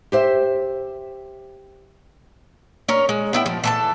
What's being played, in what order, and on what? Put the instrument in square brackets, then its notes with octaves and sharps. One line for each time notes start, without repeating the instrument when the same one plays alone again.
[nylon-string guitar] G4 C5 E5
[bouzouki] C#4 A#4
G#3
B3 E4 G5
F3
E3 A4 A5